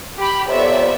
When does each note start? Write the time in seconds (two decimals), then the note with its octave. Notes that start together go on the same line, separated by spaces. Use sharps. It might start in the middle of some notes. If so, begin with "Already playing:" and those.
0.18 G4 B5
0.49 F2 C3 B3 C#5 D5 E5